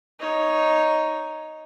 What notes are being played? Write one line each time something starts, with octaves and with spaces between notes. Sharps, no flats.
D#4 C#5